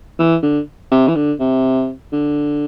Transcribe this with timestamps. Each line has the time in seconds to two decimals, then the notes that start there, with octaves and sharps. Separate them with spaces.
0.19 E3
0.42 D3
0.91 C3
1.08 E3
1.15 D3
1.40 C3
2.12 D3